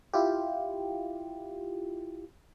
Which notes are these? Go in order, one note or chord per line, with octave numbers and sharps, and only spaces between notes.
E4 F4 G4